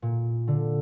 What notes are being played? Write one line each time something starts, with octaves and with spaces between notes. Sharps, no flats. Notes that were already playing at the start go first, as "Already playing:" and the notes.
A#2
D3